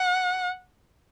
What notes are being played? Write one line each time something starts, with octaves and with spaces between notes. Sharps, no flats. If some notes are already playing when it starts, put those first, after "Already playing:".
Already playing: F#5